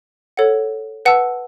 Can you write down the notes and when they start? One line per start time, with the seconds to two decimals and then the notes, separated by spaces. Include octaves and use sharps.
0.37 A4 C#5 F#5
1.05 B4 F#5 A5 E6